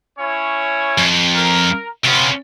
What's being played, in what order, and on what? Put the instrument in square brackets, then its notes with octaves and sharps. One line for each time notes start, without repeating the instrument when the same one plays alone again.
[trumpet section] C#4 E4 C#5
[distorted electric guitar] F2
[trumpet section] A#4
[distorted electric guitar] C3 C#4 [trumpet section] B3 F4